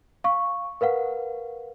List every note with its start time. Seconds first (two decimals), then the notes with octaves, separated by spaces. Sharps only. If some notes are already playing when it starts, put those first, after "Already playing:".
0.24 F5 C#6
0.81 A#4 B4 F5 F#5